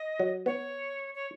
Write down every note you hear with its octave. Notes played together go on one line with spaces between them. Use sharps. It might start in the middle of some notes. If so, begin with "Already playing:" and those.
Already playing: D#5
F#3
B3 C#5
C#5